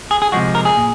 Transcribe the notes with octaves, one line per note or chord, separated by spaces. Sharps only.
G#4
G#4
C3 F3 G#3 F#4
A#4
G#4
A#2